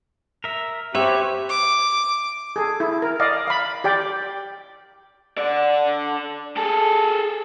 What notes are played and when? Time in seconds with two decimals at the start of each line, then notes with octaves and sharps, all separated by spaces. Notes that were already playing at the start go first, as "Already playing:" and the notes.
0.44 A#4 E5
0.95 C4 G4 B4 C#5 E5
1.49 D6
2.56 G#4 A4
2.80 E4
3.02 A#4
3.20 D5 D#5 F5
3.48 F5 B5
3.84 G4 D5 G5
5.38 A4 D5
6.57 G#4 A4